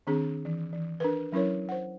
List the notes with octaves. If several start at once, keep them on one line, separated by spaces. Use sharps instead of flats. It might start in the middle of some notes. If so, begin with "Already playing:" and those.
D#3 C4 D4 G#4
E3
E3
D4 A#4 B4
F#3 C#4 E4 A#4 C#5
C5 F#5